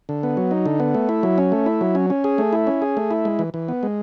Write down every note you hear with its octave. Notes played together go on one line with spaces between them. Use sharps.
D3
B3
F#3
D#4
D3
B3
A3
E4
F#3
C#4
A3
E4
F#3
C#4
C#4
G#4
A3
E4
C#4
G#4
A3
E4
G#3
E3
E3
B3
G#3